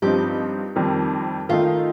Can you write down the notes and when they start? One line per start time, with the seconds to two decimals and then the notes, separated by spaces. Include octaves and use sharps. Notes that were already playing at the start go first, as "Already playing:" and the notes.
0.02 G2 F3 C4 D#4 G4
0.76 F2 D#3 G3 C4
1.49 D#3 A3 D#4 F4